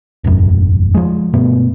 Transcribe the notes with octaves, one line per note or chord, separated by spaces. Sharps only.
E1 A1 F#2
F3 G#3
G2 B2 A3 B3